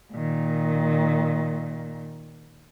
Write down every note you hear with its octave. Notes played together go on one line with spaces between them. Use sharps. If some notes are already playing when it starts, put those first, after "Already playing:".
A#2 D#3